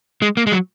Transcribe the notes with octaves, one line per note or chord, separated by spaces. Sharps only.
G#3
A#3
G#3
F#3